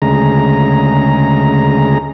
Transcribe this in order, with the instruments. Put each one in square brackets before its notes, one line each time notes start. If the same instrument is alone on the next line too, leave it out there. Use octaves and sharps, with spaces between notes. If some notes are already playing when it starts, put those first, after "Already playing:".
[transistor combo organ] D2 C#3 G#3 A#5